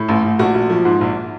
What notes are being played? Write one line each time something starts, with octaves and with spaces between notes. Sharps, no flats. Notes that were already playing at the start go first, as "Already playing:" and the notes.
Already playing: A2
A1
A1
A#1 F#4
A#1
F3
G#2
A#1